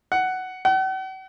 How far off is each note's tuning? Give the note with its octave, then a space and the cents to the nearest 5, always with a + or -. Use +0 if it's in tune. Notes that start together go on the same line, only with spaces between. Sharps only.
F#5 +10
F#5 +45